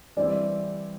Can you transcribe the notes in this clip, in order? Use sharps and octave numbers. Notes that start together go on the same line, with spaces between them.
E3 G3 C4 E4 D5